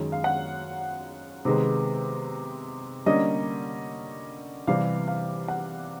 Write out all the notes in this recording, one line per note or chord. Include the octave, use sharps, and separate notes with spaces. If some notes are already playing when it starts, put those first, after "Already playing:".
Already playing: F#2 D#3 G#3 C#4
F5
F#5
C3 D#3 G#3 B3
D3 G3 A#3 C#4 D#5
C3 E3 G3 F5
F5
F#5